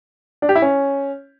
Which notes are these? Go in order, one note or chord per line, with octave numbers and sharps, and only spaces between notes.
D4
G4
E4
C#4